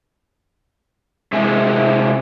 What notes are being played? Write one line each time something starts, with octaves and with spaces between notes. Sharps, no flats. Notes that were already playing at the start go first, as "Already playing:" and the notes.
C3 G#3 E4 G#4